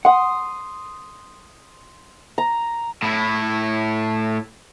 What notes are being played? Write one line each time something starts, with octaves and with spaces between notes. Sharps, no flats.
F#5 C6 D#6
A#5
A2 E4